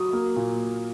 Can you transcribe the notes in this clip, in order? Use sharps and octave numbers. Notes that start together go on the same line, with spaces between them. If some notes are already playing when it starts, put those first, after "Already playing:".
Already playing: F#3 D#6
A#3
A#2